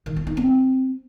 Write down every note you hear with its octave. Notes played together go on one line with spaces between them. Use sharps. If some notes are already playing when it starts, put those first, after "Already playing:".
D#3
F4
D#4
C4